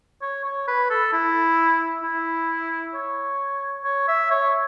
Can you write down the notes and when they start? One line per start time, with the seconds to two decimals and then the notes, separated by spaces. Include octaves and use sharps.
0.22 C#5
0.45 C#5
0.67 B4
0.90 A4
1.13 E4
2.03 E4
2.94 C#5
3.84 C#5
4.08 E5
4.31 C#5